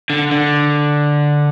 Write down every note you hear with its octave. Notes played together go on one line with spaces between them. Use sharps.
D3
D3